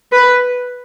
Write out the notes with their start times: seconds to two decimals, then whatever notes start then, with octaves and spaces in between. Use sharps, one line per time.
0.12 B4